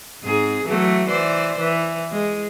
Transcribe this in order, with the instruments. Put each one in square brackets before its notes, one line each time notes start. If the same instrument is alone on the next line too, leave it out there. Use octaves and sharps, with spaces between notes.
[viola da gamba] G#2 C4 G#4
E3 F#3 A3
E3 C5 D5
E3
G#3